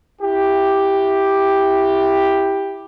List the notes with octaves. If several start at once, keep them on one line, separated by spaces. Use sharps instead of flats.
E4 G4